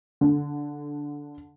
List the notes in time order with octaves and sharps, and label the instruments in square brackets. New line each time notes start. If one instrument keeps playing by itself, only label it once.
[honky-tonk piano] D3